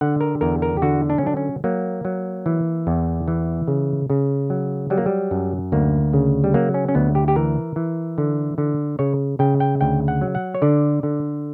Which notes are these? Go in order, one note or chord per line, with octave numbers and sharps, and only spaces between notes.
D3 F#5
A#4
E2 A#4
A#4
G4
D3 F#4
D4
C#4
F#3 D4
C#4
F#3 A#3
F#3
E3
E2
E3
C#3
C#3
F#3
F#3 G3
A#3
G3
F#2
D2 A#3
C#3
G3
F#3 A#3
C#4
C#4
D2 B3
G4
G4
E3 A#4
E3
D3
D3
C#3 C#5
C#3 G5
G5
D2 G5
F#5
F#3
F#5
C#5
D3 D5
D3